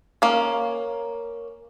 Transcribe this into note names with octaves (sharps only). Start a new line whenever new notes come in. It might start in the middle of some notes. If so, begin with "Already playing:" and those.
A#3 C#4